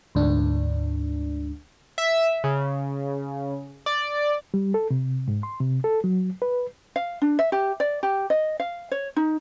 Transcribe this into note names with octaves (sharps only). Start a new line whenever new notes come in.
D2 G#2 D4
E5
C#3
D5
G3
A4
C3
G#2
C6
C3
A4
F#3
B4
F5
D4
E5
G4
D5
G4
D#5
F5
C#5
D#4